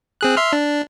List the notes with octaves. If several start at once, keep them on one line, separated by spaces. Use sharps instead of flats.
C4 G#4 F#6
E5 C6 F6
D4